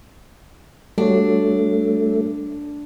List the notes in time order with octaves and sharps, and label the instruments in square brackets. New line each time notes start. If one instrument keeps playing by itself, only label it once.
[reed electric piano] G3 F#4 C#5 [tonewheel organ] A3 [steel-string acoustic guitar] D4